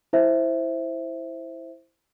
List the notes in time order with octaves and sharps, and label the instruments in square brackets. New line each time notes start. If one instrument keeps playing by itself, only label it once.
[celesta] E4 C5 E5